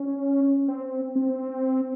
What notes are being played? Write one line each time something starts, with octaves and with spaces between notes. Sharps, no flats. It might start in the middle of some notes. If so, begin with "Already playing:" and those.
Already playing: C#4
C4
C4